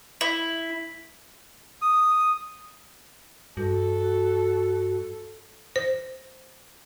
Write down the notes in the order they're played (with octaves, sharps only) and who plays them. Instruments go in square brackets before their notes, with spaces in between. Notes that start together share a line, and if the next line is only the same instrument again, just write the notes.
[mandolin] E4
[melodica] D#6
[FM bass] G2 [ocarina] F#4 [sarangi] A4
[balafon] C5